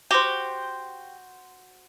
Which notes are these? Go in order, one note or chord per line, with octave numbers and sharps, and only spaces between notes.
F#4 G4 C5